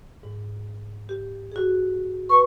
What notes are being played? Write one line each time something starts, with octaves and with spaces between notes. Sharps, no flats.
G#2
G4
F#4 G#4
B4 C#6